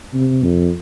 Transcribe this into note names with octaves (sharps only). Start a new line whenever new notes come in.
C3
F2